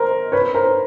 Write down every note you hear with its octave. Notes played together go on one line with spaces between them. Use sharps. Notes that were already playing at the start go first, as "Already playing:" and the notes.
Already playing: A#4 C5
B4 C#5
A#4 C5